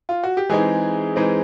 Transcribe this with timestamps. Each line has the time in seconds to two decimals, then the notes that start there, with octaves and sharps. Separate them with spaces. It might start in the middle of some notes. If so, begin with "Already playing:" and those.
0.09 F4
0.23 F#4
0.37 G4
0.49 E3 G#3 C4 D#4 G#4
1.16 E3 G#3 C4 D#4